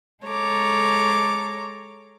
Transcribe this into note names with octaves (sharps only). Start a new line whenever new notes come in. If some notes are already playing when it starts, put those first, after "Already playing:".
G#3 A4 C#5 A#5 D6